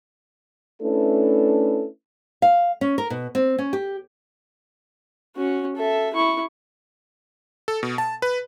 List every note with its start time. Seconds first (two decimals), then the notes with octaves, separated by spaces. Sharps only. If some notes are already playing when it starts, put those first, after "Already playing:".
0.82 A3 C#4 D4 E4 A4 B4
2.42 F5
2.81 C#4
2.98 A#4
3.10 B2
3.35 C4
3.58 C#4
3.73 G4
5.36 C#4 F#4
5.76 A4 E5
6.14 E4 C#6
7.68 A4
7.83 B2
7.98 A5
8.22 B4